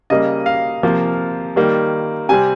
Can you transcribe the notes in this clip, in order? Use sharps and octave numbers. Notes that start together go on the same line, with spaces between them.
C#3 G3 A#3 D#5
F5
C3 F3 A#3
D#3 G3 A#3
C3 G3 C4 G#5